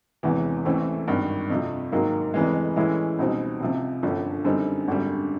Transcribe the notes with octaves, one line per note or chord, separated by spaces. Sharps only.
E1 E2 C3 E3
A1 A2 E3 A3 C4
G#1 G2 D#3
F2 C3 F3
G#2 D#3 F#3 A#3
F1 F2 C#3 E3 G#3
A2 E3 G#3 C#4 E4
C#2 B2 G3 C4 D#4
C#2 C3 F3
G1 F#2 D3 F3
F#2 D3 G3 C4 D#4
G#1 F#2 D3 G3